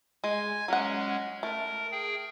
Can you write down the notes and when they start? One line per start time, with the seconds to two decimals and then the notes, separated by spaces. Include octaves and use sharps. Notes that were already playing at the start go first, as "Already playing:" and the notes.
0.24 G#3 G#5 G#6
0.68 F#3 G#3 C#4 F#5
1.43 A3 A#4
1.92 G#4 G5